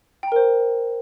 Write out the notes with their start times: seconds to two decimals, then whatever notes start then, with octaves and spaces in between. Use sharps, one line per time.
0.23 G5
0.27 A#5
0.32 A#4
0.36 C5